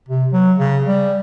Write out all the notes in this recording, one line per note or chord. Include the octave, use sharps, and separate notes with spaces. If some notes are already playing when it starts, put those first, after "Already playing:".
C3
F#3
C#3
G3